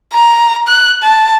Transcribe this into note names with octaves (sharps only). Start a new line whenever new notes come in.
A#5
F#6
A5